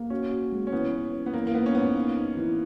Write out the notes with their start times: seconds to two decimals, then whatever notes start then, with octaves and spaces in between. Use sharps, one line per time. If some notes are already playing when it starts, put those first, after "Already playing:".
Already playing: A#3
0.10 C#4 F#4
0.31 F#4
0.52 G#3
0.67 C#4
0.72 E3 B3
0.93 C#4
1.14 C#4
1.26 B3
1.34 E3 A#3
1.47 A#3
1.54 G#2 B3
1.66 C#4
1.75 G#2 B3
1.95 A#3
2.16 D#4
2.37 E3